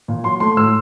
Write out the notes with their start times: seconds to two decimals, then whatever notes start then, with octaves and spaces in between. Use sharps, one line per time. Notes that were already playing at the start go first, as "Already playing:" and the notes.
0.08 A#2
0.24 F#3 C6
0.40 A3 C6
0.57 A2 E6